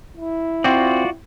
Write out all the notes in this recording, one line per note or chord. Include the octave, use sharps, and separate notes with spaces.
E4
C4 F4 F#4 D5